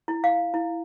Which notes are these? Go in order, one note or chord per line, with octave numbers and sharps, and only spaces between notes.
E4
F5
E4